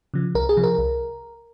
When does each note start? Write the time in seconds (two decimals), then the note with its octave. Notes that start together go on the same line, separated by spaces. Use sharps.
0.14 C#3 F3
0.35 C2 A#4
0.49 G#4
0.57 C3 F3
0.63 A#4
0.78 C2